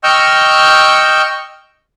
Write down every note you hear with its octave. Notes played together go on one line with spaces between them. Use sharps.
D#5 G5 C#6 E6 F6 G6